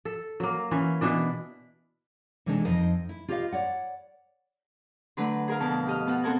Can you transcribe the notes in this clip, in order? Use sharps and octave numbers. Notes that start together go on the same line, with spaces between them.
A4
F#3 A#3
E3 C#4
B2 E3 D4 D5
C3 E3 G#3 D4 D#4 A4
F2 D#4 C5 D#5 G5
E4
F4 G4 B4 C5 D#5 F5
C#5 D5 F#5
D3 F#3 A3 D4 B4
G#4 A#4 F5
F2 B2 A#4 A5
G4 D#5 F6
B3 F4 F#4
B3 C4 F#4 A4 A#4 G#5